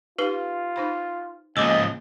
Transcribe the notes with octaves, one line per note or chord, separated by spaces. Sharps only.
D#4 F4 G4 B4 F5 C7 G7
D#4 C5 B5
C#2 F3 A#3 G#4 D#5 G#5 D6 E6